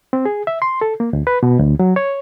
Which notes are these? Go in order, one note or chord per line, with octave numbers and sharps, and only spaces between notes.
C4
G#4
E5
C6
A4
A#3
D2
B4
B2
D2
F#3
C#5